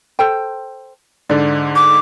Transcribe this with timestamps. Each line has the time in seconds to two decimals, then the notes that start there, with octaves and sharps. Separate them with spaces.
0.19 A4 C5 G5
1.29 G#2 D3 D5
1.76 D6